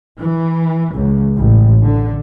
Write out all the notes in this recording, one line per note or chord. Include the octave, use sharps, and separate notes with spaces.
E3
C#2
A1
D3